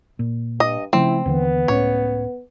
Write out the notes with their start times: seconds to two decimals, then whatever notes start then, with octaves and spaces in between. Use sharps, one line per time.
0.19 A#2
0.60 G2 D#5
0.93 C#3 F3 A3 C4 E4
1.26 D#2 D3 E3 B3
1.68 C#2 A2 C#4 C#5